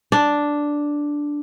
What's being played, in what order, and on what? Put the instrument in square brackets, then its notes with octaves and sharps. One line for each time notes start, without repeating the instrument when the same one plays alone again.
[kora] D4